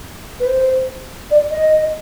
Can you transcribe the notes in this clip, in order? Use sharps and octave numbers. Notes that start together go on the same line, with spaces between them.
B4
C5
D5
D#5